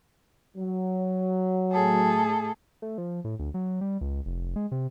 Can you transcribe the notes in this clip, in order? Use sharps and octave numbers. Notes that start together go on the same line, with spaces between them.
F#3
A2 G#4 A4
A3
F3
A2
D2
F#3
G3
C#2
F1
G#3
C3